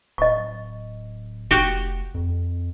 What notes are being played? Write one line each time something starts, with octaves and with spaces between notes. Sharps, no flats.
D1 D#5 C#6
F1 F#4 G4
F2